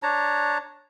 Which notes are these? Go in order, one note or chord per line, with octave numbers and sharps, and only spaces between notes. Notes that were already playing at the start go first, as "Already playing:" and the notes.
D4 C#5 A5 A#5